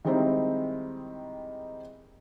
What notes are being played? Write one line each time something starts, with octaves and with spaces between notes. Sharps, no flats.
D#3 G3 G#3 C4 D#4 E4